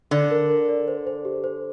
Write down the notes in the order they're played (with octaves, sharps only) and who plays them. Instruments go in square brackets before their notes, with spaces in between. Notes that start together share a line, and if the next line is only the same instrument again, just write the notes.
[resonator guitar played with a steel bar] D3 [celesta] D5
[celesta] A#4
A#4
D5
C5
C5
G4
C5